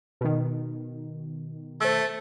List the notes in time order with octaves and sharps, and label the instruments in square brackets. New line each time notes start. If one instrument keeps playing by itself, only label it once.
[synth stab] B2 D#3
[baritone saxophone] A3 [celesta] C5 E6